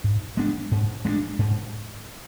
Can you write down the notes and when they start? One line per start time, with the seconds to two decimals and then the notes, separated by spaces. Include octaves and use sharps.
0.04 G#2
0.37 G#3 B3 D4
0.71 G#2
1.05 G#3 B3 D4
1.39 G#2